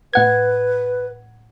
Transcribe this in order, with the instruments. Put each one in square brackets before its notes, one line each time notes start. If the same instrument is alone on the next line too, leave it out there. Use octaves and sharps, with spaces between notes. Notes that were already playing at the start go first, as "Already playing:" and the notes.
[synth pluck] A2 F#5 G#6 [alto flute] B4